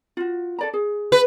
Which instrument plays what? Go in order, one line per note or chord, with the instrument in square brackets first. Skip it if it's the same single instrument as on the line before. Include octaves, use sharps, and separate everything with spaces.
[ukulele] F4 F#4
A4 D5 A#5
G#4
[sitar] B4